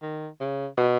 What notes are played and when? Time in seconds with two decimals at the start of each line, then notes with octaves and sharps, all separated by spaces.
0.02 D#3
0.41 C#3
0.78 B2